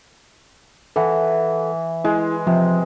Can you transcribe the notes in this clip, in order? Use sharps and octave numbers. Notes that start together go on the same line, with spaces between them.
E3 A4 F#5
G#3 E4
C3 F3